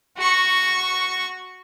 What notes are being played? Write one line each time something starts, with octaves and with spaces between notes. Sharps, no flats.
F#4 C#6